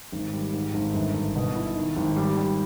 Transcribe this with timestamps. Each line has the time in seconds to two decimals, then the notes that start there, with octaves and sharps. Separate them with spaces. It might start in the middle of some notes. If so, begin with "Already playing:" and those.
0.12 G#1
0.33 G3
0.53 G#2
0.74 G#1
0.94 G1
1.14 G1
1.36 B2
1.55 E4
1.76 D#3
1.96 G#1
2.17 G3
2.37 G3